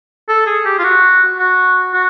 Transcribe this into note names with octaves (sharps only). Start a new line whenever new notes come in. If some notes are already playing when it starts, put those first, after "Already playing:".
A4
G#4
G4
F4
F#4
F#4
F#4